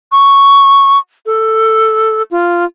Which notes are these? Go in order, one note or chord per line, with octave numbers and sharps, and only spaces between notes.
C#6
A4
F4